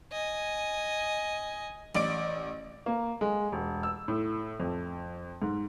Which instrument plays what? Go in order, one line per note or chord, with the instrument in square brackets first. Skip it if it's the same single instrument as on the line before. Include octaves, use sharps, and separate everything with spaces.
[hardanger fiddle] D#5 G#5
[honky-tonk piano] A1 D5 D7
[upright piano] A#3
G#3
E1
E6
A2
F2
G#2